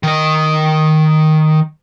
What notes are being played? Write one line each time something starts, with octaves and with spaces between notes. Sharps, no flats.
D#3 D#5